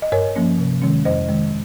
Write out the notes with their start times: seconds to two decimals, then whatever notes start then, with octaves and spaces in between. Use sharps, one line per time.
0.02 D#5
0.12 G2 A#4 C#5
0.36 F3 A#3 C#4
0.58 C3
0.82 D#3 G#3 C#4
1.05 F2 C5 D#5
1.28 D#3 G#3